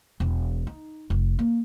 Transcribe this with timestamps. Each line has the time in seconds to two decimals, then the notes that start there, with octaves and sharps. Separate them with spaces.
0.20 E1
0.67 D#4
1.10 F1
1.39 A#3